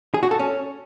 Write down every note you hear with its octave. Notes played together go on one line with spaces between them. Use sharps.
G#4
F#4
A4
C#4